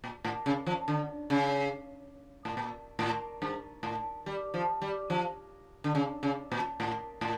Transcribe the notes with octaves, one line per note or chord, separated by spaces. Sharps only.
A#2
A2
C#3
F3
D3
C#3
A2
A#2
A2
G2
A2
G3
F3
G3
F3
D3
C#3
C#3
A#2
A2
A2